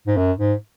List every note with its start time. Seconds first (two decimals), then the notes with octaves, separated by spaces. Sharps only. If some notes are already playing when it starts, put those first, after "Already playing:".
0.07 G#2
0.17 F#2
0.39 G#2